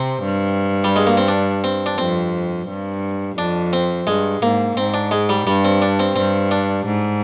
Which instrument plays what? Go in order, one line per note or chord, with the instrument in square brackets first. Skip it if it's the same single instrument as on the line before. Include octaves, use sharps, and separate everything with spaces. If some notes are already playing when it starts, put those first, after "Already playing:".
Already playing: [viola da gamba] C3 [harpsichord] C4
[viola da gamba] G2
[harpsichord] G3
G#3
A#3
C4
D4
C4
D4
[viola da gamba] F2 [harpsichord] C4
[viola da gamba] G2
[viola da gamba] F2 [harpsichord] D4
[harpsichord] C4
[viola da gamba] G2 [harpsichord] G#3
[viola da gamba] G#2 [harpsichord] A#3
[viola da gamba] G#2 [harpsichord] C4
[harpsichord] D4
G#3
G3
[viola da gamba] G2 [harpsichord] G3
[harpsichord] C4
D4
C4
[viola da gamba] G2 [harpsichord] C4
[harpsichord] D4
[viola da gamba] G#2